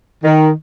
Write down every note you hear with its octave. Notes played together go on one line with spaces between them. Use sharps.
D#3